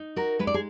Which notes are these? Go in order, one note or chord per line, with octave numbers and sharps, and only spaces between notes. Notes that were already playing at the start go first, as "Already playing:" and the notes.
Already playing: D#4
F#4 A#4
G#3 B4
D5
G#4